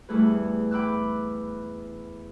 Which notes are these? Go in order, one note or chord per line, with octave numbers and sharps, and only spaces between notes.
E2 E3 G3 A3 G#4 B4
G5 B5 D6 E6 F#6